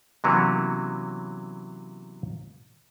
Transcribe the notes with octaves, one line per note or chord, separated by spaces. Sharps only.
C3 E3 F#3 A#3 B3 C#4